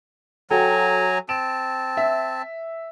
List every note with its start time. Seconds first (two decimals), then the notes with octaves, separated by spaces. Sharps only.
0.51 F#3 F#4 A4 G5 G#5 A#5
1.29 C4 A5 D7 E7
1.97 E5